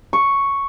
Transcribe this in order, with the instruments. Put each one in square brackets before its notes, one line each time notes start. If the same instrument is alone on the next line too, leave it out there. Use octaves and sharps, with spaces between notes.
[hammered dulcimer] C#6